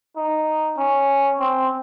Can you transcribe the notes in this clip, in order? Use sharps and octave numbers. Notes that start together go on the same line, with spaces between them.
D#4
C#4
C4